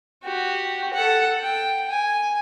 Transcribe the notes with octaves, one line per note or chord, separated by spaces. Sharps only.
F#4 G4
A4 F#5
G5
G#5